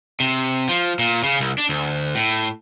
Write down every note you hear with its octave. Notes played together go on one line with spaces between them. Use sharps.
C3
F3
A#2
C#3
C2
D4
D2
A2